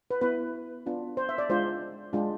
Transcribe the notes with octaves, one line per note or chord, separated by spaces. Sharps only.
B4
B3 E4 B4
B3 D4 F4
C5
E5
D5
G#3 D4 F4 C5
G#3 D4 F4